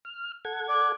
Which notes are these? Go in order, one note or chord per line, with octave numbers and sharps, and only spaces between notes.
F6
A4 F#5 G#6
D5